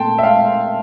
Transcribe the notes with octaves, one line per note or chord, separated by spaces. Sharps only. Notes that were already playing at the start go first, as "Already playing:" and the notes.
Already playing: A#2 A3 C4 G5 A5 C6
E5
F5